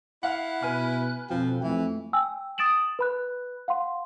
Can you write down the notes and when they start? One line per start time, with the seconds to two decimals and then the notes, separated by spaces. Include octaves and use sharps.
0.23 E4 F5 F#5 F#6
0.62 B2 B4 G#5 F6
1.30 F2 B2 F3 C4
1.63 F2 E3 A3
2.13 G5 G#5 E6
2.58 D#6 A6 D7 E7 F#7
2.99 B4 B5 F#6
3.68 F5 F#5 C6